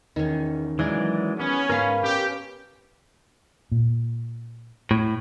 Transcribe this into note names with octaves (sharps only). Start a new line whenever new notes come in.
E2 D#3 C#4
E3 F#3 G#3 G#4 A#4 D5
B3 C#4
G#2 B3 A#4 F5 B5
C#4 G4
A#2
A2